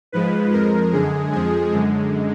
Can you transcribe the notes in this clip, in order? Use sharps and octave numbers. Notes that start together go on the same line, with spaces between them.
G#2 F3 G#3 B4
F2 F3 G#3 A#4
F#2 D3 G#3 G#4
F2 F3 G#3 G#4
F#2 D3 G#3